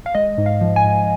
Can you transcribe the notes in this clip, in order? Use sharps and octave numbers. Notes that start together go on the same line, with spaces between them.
F5
G#3 D#5
G#2
F5
F3
G#5
G#2